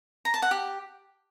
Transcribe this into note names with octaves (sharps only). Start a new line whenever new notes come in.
A#5
A5
F#5
G4